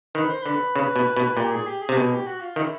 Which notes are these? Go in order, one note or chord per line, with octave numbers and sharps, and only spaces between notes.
D#3 B4
C5
D3 B4
C#3
B2
B2
A#2 G4
G#4
G4
G#4
C3
B2 G#4
G4
F#4
F4
D#3 E4